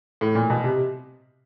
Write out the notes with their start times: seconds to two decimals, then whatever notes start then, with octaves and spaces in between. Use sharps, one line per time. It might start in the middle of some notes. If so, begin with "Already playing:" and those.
0.21 A2
0.35 A#2
0.50 B2
0.64 C3